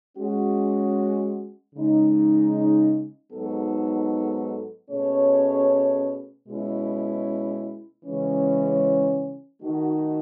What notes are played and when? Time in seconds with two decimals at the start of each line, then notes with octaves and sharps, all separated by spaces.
0.17 G#3 C#4 F#4
1.75 C#3 G#3 D#4
3.32 G#2 F#3 B3 D#4 A4
4.90 B2 A3 C#4 G#4 C#5
6.47 B2 G#3 C#4 E4
8.05 C#3 E3 G#3 C#4
9.62 D#3 A3 D#4 F#4